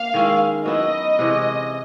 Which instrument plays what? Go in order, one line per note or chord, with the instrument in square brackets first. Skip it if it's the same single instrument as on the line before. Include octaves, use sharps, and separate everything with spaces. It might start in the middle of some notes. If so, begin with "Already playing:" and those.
Already playing: [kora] A#3 [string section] F5
[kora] D#3 G#3 C#4 E4
[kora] F#3 B3 E4 [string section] D#5
[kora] C3 E3 G#3 C#4